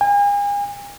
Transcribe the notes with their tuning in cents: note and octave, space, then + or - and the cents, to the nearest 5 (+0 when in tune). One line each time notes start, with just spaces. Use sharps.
G#5 -40